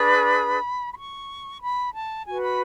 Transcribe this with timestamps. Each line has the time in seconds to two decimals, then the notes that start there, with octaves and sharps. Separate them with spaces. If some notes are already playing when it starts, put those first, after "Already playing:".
Already playing: D4 G#4 B4 B5
0.92 B5
0.96 C#6
1.61 B5
1.94 A5
2.26 F#4 B4 G#5
2.42 B5